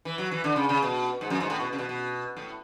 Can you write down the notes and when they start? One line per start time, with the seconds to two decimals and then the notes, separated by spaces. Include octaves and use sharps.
0.05 E3
0.18 F#3
0.31 E3
0.44 D3
0.56 C#3
0.69 C#3
0.83 B2
1.21 G#2
1.30 F#2
1.40 G#2
1.50 A2
1.60 B2
1.73 C#3
1.79 B2
1.89 B2
2.37 A2